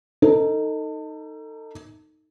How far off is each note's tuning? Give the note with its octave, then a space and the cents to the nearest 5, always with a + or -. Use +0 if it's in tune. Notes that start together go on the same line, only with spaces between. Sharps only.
D#4 +0 A4 +30